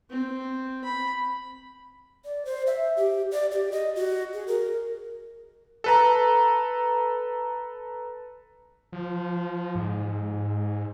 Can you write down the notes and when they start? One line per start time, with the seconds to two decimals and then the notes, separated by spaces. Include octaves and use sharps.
0.10 C4
0.84 B5
2.25 D5
2.45 C5
2.67 E5
2.97 G4
3.32 D5
3.52 G4
3.72 D#5
3.96 F#4
4.34 G#4
4.48 A#4
5.84 A4 B4 A#5
8.93 F3
9.75 G#2